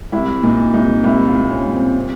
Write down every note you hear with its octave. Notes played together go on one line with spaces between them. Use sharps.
C2 E4
A#2 D#4
C2 D#4
C2 E4
F4
A#2
C#4
C2
C4
C4